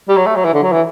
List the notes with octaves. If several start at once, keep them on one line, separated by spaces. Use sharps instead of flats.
G3
F#3
A3
F#3
E3
D3
F#3
E3